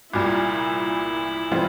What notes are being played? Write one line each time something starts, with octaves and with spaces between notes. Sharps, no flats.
C2 A#2 G3 E4
E3 G3 C4 F4